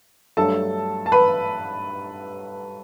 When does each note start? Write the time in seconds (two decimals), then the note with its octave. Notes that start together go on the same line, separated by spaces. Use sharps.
0.37 G2 F#3 A3 A4 A5
1.06 A5
1.12 B4 B5